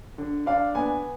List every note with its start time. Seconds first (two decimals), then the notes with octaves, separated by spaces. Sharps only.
0.18 D3
0.46 D4 F5
0.75 B3 G#5